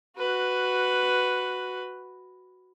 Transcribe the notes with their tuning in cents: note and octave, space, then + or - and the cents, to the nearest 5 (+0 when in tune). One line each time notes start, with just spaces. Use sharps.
F#4 +0 B4 +5